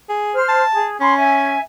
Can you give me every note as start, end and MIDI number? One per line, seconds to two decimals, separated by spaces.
0.09 0.35 68
0.35 0.61 72
0.35 0.61 89
0.48 0.86 81
0.73 0.95 68
1.00 1.55 61
1.00 1.14 83
1.00 1.14 84
1.17 1.59 76
1.17 1.59 80